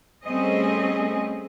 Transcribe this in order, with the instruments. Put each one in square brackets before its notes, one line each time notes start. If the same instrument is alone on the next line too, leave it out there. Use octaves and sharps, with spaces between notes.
[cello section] G3 A3 C4 C#4 G#4 D#5